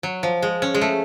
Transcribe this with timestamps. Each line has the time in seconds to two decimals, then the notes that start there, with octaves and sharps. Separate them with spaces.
0.03 F#3
0.23 F3
0.42 G#3
0.62 C#4
0.74 G#3
0.81 A3